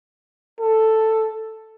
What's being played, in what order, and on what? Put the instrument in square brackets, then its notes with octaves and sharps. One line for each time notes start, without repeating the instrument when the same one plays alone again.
[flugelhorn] A4